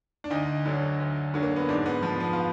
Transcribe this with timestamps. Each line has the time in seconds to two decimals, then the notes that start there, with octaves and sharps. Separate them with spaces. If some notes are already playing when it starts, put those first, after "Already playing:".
0.24 D4
0.30 D2 D#4
0.66 D3 F#3
1.00 D2
1.34 D3 F#3
1.43 A#3
1.56 B3
1.69 G#2 D4
1.86 B3
2.03 F3 B3
2.20 B3
2.33 F4